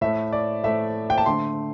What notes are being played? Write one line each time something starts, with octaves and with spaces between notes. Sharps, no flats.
A2 A3 E5
D5
A2 A3 E5
G5
A5
D3 A3 C6